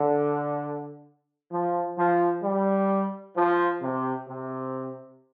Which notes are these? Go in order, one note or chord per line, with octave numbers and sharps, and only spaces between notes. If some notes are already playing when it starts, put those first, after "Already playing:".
Already playing: D3
F3
F3
G3
F3
C3
C3